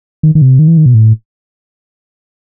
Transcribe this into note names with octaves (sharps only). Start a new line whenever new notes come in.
D#3
D#3
C3
D#3
E3
D#3
B2
A2